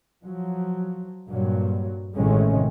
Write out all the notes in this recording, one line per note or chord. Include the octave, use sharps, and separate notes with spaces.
F3 F#3
G2 A#2 F#3
A1 A2 C3 D#3 G#3 C#4